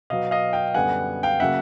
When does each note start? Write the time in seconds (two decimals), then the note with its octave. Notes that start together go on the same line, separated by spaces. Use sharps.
0.10 B2 F#3 B3 D#5 F5
0.31 D#5 F5
0.53 F5 G5
0.75 F#2 D3 G3 B3 F#5 G#5
1.23 F5 G5
1.40 C#3 F#3 A#3 E5 F#5